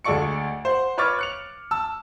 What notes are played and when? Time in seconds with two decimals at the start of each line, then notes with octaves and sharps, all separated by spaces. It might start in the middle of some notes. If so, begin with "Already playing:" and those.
0.04 D2 G#3 A4 D5 C#6 C#7
0.65 C5 F#5
0.98 B4 C#5 C#6 D6 F6 A6
1.19 F#6 C#7 F7
1.71 A5 E6